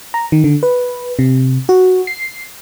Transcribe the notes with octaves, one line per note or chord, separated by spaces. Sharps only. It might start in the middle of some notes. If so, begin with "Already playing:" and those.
A#5
D#3
D3
B4
C3
F#4
C7